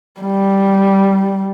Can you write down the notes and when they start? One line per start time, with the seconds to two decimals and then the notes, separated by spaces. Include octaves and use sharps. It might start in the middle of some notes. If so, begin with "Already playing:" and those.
0.21 G3